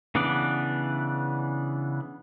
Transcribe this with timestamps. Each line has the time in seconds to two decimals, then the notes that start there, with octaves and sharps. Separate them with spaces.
0.15 C#3 E3 B3 D4 D5